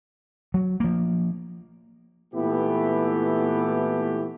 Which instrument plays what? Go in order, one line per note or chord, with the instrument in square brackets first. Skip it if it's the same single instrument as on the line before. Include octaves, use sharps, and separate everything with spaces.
[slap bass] F#3
F3 A#3
[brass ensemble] A#2 E3 A3 B3 E4 G4